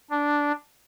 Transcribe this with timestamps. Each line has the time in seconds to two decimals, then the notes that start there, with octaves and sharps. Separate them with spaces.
0.11 D4